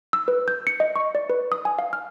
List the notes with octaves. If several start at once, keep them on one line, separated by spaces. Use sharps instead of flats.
E6
B4
G6
C#7
D#5
C#6
D5
B4
D#6
G#5
F5
F6